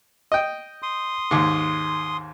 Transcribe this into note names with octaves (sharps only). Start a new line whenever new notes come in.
D#5 G5
C6 D#6
D#2 G#2